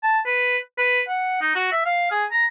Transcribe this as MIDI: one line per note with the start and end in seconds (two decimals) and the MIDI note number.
0.03 0.19 81
0.26 0.57 71
0.78 1.01 71
1.08 1.40 78
1.41 1.54 63
1.55 1.69 66
1.72 1.84 76
1.85 2.09 77
2.11 2.25 68
2.31 2.45 82